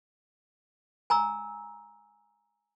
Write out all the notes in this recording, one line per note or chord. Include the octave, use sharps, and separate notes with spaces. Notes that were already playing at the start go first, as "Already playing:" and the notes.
G#5 A#5 E6